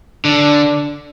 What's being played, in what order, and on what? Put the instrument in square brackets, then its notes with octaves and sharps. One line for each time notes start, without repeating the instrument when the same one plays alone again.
[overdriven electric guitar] D3 [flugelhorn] D4